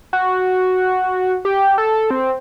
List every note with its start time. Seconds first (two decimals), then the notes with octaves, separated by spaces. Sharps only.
0.13 F#4
1.45 G4
1.78 A4
2.10 C4